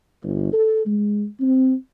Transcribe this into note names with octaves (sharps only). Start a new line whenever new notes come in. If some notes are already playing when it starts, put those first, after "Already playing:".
G1
A4
G#3
C4